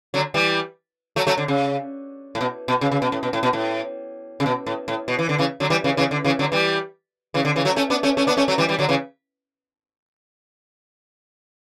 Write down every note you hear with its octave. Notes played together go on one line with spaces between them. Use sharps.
D3 F#3
E3 G3
F#3 A3
F#3 A3
D3
C#3
A2
B2
B2
C#3
C#3
B2
A2
B2
A2
B2
A2
C#3
B2
A2
A2
B2
E3
D3
C#3 E3
D3 F#3
E3 G3
C#3 E3
C#3 E3
D3
C#3 E3
D3 F#3
E3 G3
C#3 E3
D3
C#3 E3
F#3 A3
A3 C#4
B3 D4
A3 C#4
A3 C#4
B3 D4
A3 C#4
F#3 A3
E3 G3
E3 G3
D3 F#3
C#3 E3